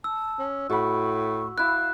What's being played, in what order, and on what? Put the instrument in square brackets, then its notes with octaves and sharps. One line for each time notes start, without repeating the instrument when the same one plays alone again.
[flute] A5 [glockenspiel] E6
[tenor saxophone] C#4
[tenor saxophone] A2 [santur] F#4 B5 [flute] C#6
[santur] E4 D6 [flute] F5 [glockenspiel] F#6